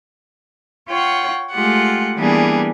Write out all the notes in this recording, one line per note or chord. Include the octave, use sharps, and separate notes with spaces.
F4 C#5 F#5 G5
G#3 A3 F4 G4 F#5
E3 G3 A#3 B3 D4 G#4